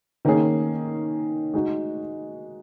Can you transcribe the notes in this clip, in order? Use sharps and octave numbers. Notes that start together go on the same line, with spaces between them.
D#3 A#3 C#4 G#4
G#3 D#4 F#4